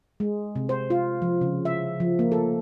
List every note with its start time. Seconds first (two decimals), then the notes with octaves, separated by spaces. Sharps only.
0.20 G#3
0.55 C3
0.69 C5
0.90 F4
1.22 F3
1.41 C#3
1.65 E5
2.00 F3
2.19 A#3
2.32 A4